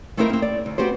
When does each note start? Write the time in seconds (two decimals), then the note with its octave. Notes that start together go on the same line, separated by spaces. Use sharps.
0.17 A3 B3 C4 D#4 E4 A#4
0.30 A#3 C4
0.42 D5
0.66 D2
0.78 B3 C4 F#4 G4 C5